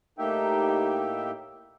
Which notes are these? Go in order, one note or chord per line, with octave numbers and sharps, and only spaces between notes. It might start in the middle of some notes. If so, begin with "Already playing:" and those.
A2 A#3 D#4 G4 E5 G5